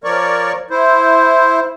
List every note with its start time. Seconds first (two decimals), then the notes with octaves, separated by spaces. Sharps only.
0.04 F3 A#4 C#5 D5 C#6
0.70 E4 C5